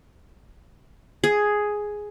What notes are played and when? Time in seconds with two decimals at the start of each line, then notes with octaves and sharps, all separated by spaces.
1.24 G#4